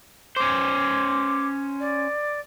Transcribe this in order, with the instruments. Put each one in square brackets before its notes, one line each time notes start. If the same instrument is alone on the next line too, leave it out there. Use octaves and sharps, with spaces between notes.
[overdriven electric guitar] C#4 C5 [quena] D6
[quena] D5